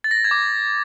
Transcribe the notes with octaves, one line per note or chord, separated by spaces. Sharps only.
A6
A#6
A6
G#6
D6